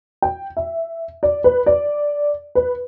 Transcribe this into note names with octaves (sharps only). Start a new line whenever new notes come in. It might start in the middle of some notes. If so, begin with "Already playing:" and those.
G5
E5
D5
B4
D5
B4